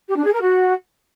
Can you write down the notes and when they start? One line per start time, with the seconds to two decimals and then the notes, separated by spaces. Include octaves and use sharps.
0.08 G4
0.16 D4
0.25 G#4
0.33 A#4
0.41 F#4